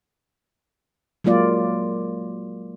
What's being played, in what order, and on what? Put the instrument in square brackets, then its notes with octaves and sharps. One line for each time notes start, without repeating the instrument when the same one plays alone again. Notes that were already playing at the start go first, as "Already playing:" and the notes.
[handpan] F#3 G#3 A#3 F4 D5